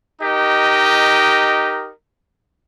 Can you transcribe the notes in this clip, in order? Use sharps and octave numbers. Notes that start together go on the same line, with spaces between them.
D#4 G4 A#4 D#5